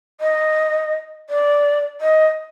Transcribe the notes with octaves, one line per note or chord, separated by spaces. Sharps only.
D#5
D5
D#5